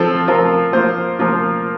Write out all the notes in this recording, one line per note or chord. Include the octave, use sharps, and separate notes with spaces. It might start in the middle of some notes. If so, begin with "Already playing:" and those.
Already playing: F3 C4 F4 A4
F3 C4 F4 A#4
F3 A#3 F4 C5
F3 A#3 F4